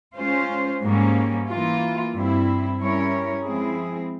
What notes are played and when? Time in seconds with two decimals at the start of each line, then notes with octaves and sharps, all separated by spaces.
0.16 G#3 C#4 F4 C5
0.82 G#2 G3 A#3 C#4
1.48 E3 A#3 F4
2.14 G2 G3 C4 E4
2.79 G3 C#4 E4 A#4 C#5
3.45 F3 G#3 C4 E4 G#4